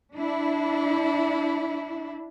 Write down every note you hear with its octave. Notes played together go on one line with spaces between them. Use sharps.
D4 E4